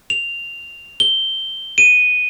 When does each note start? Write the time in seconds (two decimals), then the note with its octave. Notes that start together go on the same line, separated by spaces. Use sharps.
0.10 F7
1.00 G7
1.78 D#7